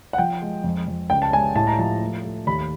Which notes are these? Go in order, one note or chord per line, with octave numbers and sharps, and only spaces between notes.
F#5
F3 G5
G#3
F2
F2
C#2 G5
A5
G#3 G#5
A2 A5
A#5
F3 A5
A3
A3
D#2 B5